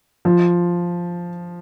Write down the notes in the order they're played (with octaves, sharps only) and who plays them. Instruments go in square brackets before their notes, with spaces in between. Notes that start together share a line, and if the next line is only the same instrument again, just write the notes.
[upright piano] F3